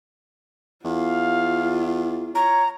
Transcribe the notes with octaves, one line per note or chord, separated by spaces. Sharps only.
E2 F4 F5
C#5 A#5